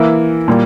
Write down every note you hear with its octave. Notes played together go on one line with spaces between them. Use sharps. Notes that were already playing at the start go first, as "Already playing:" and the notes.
Already playing: E3 A#3 E4
A#2 G3 A#3